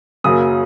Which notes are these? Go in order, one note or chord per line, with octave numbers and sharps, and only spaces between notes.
F#2 C#3 F#3 A#3 C#4 D#6